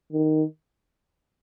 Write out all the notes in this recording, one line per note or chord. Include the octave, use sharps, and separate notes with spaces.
D#3